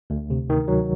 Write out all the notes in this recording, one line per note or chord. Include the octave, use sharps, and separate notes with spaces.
D2
C3
D#3
F#3